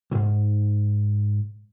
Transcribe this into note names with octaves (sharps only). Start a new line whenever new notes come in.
B1 G#2